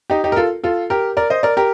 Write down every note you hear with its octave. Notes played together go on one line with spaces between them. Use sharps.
D#4 G4
D#4 G4
A#4
F4 A4
F4 A4
G4 A#4
A#4 D5
C5 D#5
A#4 D5
G4 A#4